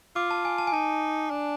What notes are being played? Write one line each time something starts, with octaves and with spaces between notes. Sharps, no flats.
F4 D6
A5
G#5
A5
G#5
D#4 A5
D4